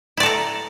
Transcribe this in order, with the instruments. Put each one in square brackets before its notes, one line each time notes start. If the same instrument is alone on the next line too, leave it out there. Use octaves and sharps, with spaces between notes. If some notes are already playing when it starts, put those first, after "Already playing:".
[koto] E4
D5
A4
A#5